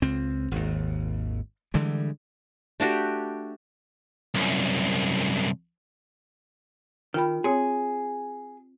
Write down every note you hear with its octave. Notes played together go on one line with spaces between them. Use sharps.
C#2 C4
G#1 D#2
D3 E3 G3 G#3
A3 D4 F#4 G4
C2 F#2
D#3 F4 G5 B5
C4 G#4 C#5